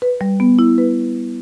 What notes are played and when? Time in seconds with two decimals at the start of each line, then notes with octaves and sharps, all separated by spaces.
0.02 B4
0.21 G3
0.40 B3
0.59 E4
0.78 B4